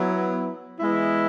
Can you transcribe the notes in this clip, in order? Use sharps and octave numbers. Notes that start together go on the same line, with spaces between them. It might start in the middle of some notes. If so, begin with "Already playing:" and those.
Already playing: F#3 B3 E4
E3 G#3 B3 E4